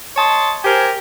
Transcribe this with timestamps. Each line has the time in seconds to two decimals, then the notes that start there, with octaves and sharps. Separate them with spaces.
0.16 C#5 D#5 A5 C6
0.64 G4 A#4 C5 G#5